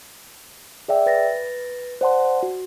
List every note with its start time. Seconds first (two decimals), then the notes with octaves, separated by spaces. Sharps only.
0.88 G#4 D5 E5 G5
1.06 B4 A6 A#6
2.01 C5 D5 F#5 A5 C6
2.43 F#4